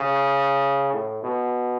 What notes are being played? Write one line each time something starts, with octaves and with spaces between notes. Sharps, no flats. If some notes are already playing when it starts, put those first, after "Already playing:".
Already playing: C#3
A2
B2